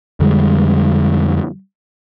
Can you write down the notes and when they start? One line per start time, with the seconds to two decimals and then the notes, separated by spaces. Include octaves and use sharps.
0.20 F2 D3 G3 G#3